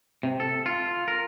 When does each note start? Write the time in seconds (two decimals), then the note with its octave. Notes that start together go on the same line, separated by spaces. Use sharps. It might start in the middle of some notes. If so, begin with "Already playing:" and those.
0.23 C3
0.40 A4
0.66 F4
1.08 A#4